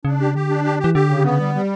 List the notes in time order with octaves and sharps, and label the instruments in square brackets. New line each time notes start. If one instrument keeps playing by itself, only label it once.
[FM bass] C#3 [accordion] D4
[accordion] G4
[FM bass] D3 [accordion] G4
[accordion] D4
G4
G4
[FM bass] E3
[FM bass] D3 [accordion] G4
[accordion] C#3
B3
G3
G3